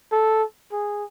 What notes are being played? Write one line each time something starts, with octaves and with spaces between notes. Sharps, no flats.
A4
G#4